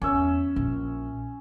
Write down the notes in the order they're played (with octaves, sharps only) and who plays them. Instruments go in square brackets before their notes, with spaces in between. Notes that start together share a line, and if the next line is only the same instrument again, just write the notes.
[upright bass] E2 [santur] C#4 E5
[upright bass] A#1